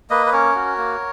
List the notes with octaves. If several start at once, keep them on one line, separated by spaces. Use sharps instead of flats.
A#3 B4 D#5
B4
C#4 A#4 C#5
F#4
A#3